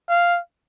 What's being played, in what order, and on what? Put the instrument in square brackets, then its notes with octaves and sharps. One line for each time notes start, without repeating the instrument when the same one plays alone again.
[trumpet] F5